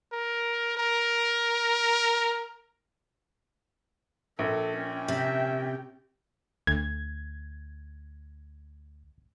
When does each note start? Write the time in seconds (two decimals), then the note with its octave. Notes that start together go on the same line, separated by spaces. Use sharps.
0.12 A#4
0.77 A#4
4.39 A#1 A4
4.78 C#4 G5
5.08 C3 E5
6.67 D2 G#6